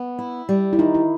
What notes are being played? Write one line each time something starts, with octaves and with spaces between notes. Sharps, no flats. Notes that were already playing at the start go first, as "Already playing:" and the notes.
Already playing: B3
E4
G3
E4
D#3 D#4
E4